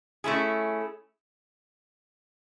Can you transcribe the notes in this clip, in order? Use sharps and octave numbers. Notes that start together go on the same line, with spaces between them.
A3 C#4 E4 G#4